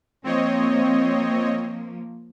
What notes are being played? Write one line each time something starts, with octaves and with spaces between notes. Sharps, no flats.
F3 A#3 C4 C#5 D#5